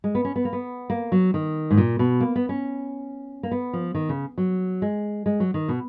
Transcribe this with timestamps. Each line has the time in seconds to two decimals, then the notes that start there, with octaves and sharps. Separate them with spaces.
0.04 G#3
0.15 B3
0.25 C#4
0.36 B3
0.45 A#3
0.53 B3
0.90 A#3
1.12 F#3
1.34 D#3
1.71 G#2
1.77 A#2
1.99 B2
2.20 A#3
2.36 B3
2.49 C#4
3.43 A#3
3.51 B3
3.73 F3
3.95 D#3
4.09 C#3
4.38 F#3
4.82 G#3
5.26 G#3
5.40 F#3
5.54 D#3
5.69 B2